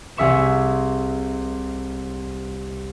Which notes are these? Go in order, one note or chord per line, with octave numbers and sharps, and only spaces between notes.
C2 G#4 E5 C#6 E7